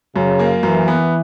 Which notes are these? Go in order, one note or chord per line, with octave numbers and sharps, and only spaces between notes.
F#2 C#3
A#3
F#2 E3
B3